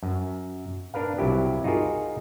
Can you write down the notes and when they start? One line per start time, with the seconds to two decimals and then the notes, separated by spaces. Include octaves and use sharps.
0.03 F#2
0.94 D4 A#4 B4 F5
1.18 C2 F#3 E4 G4
1.64 D#4 F4 F#4 G#4 A#4